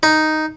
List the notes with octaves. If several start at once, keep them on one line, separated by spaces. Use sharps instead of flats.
D#4